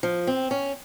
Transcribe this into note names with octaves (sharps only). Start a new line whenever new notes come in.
F3
C4
C#4